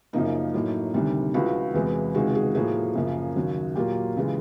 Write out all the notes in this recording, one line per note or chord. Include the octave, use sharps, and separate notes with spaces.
F#2 C#3 F3 A#3 D#4
A2 F#3 A#3
D2 C3 D#3 G3
C#2 C#3 F3 E4 F#4
E2 C3 E3 G#3
C#2 C3 D#3 G#3 F#4 G#4
F#4 G#4
A2 F3 A#3 F#4 G#4
F#2 C#3 F3 A#3
D#2 C#3 F#3
A#2 F#3 A#3 F4 G4
C#3 E3 G#3